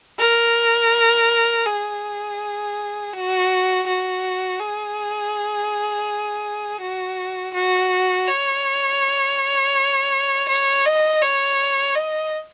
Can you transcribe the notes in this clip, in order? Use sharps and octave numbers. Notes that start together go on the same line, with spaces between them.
A#4
G#4
F#4
F#4
G#4
F#4
F#4
C#5
C#5
D#5
C#5
D#5